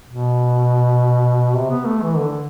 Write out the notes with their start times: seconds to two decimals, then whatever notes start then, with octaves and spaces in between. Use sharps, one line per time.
0.08 B2
1.55 C3
1.70 B3
1.86 A3
2.02 E3
2.18 D3